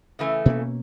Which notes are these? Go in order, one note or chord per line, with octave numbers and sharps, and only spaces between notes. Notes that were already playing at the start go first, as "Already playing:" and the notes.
C#3 E3 A3
B2 A#3 C#4